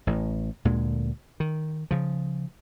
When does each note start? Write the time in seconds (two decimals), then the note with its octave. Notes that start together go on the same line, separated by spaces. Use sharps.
0.07 A1 A2
0.65 D2 A#2 D3 G#3
1.40 D#3
1.91 C#3 F3